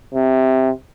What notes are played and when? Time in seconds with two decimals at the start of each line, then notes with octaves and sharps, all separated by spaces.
0.14 C3